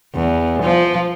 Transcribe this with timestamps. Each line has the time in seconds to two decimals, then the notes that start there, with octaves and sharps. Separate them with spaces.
0.15 E2
0.63 F3